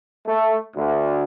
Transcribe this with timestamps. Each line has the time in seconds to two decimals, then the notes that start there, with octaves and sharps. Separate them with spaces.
0.25 A3
0.74 D2